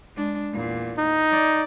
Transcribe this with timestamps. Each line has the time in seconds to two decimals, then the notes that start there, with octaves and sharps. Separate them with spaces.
0.16 G#3 D4
0.53 E2 A#2
0.98 D#4
1.31 D5